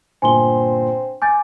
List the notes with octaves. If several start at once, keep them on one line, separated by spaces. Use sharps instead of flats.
G1 A#2 C4 G#5 C6 G7
G#5 D6 G6 A6